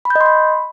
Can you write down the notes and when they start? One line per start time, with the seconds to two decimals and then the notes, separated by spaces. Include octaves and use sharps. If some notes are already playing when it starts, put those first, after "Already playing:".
0.05 B5
0.10 G6
0.16 D#5
0.21 C6
0.26 B5